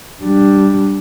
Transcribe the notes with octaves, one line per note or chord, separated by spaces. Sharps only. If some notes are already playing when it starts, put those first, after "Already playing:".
G3 D4